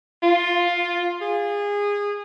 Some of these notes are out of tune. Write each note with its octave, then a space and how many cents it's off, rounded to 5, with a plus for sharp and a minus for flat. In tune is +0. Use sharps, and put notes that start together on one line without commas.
F4 +5
G#4 -25